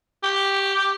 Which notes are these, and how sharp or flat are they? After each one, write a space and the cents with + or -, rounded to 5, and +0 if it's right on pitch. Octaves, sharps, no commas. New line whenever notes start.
G4 +0